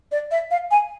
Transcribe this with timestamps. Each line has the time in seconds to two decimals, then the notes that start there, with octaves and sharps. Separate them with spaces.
0.12 D5
0.31 E5
0.51 F5
0.71 G#5